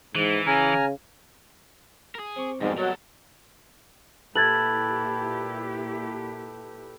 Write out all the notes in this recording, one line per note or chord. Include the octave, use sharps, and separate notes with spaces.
G#2 E3
C#3 G#5 A#5 F6
G#4 A#4
C4 C#6 D6
F2 G#2 B2 G3 A#3
F#3 A4 A#4
A#2 E4 G4 A4 B4 G#6 A6 F#7